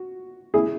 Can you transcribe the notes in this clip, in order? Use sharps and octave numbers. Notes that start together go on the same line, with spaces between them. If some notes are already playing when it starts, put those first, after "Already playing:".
Already playing: F#4
E4 G#4